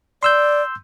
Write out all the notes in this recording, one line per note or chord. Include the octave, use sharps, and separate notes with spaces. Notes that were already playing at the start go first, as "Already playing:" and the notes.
D5 C6 E6 G6